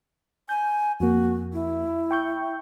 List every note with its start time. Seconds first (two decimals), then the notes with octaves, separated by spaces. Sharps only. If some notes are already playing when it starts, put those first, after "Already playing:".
0.49 G#5 G6
1.00 F2 A#3 F#4
1.53 E4
2.11 G5 C#6 G6